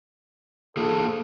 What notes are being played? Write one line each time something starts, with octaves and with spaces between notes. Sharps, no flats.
A#3 F4 G#4 A4